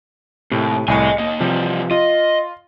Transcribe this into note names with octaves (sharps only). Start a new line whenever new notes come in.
D#2 A2 C3
C2 A2 D#5 G#5 C#7
D#2 A#3 D#5
C3 E3 F3 G3
F4 D#5